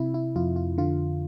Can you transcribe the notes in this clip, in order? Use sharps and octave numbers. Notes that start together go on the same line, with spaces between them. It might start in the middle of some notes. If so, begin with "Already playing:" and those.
Already playing: C3 E4
E4
F2 F4
F4
D3 F4